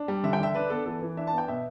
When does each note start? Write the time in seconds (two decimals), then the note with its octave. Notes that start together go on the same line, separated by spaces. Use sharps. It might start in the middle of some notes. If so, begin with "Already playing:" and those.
Already playing: D4
0.08 G3
0.23 D3 E5
0.33 G5
0.39 D3 E5
0.55 D4 B4
0.70 B3 A4
0.86 E3 A4
1.02 E3
1.17 D4 E5
1.27 A5
1.33 B3 G5
1.48 B2 E5